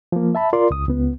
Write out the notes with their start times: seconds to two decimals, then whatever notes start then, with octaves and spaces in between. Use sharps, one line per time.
0.12 F3 A#3
0.35 E5 A5 B5
0.53 F4 A#4 D5 C6
0.71 C#2 D#6
0.88 C#2 B3